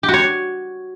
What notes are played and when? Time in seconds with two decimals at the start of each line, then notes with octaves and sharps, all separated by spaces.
0.03 G4
0.08 F#4
0.14 C#5